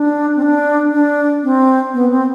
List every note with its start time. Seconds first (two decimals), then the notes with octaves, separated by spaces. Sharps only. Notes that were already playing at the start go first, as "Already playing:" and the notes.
Already playing: D4
0.36 C4
0.42 D4
0.92 D4
1.44 C4
1.94 B3
2.10 C4